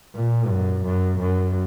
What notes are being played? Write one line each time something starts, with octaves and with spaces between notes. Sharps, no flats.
A#2
F#2
F#2
F#2